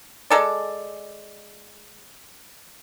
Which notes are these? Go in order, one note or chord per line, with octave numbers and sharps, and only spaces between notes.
G#3 A4 D5